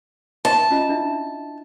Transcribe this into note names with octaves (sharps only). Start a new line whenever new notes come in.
E5 A5 C6
C#4 F4 D#5
D4 E4 E5